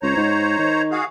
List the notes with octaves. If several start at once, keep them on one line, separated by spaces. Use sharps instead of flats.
C#2 C5 C#5 A#5
G#2
D#3
F#4 G#4 F5